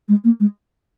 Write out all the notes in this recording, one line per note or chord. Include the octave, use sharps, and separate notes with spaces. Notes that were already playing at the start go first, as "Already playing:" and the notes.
G#3
A#3
G#3